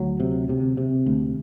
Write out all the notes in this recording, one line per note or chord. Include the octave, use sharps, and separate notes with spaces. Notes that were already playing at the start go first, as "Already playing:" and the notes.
Already playing: D2 F#3
C3
C3
C3
D2